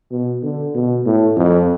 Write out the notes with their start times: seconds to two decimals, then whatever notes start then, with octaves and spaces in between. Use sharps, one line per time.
0.11 B2
0.43 D3
0.75 B2
1.06 A2
1.37 F2